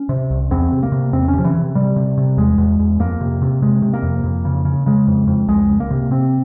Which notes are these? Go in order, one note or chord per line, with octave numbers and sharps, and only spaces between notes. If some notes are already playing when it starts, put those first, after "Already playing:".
Already playing: C#4
C3
C2
E2 C4
C3
A#3
C3
E2 C4
C#4
C3 F3
E3
C3
C3 G3
C3
C3
E2 G#3
E2
E2
F2 A#3
C3
C3
C3 G#3
C3
A#3
F2
F2
C#3
C#3
C#3 G#3
F2
F2
C#2 G#3
C#2
A#3
C3
C3 C4